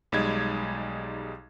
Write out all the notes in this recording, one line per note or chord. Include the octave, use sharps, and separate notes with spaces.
B1 G3 G#3 D#4 B5 G#6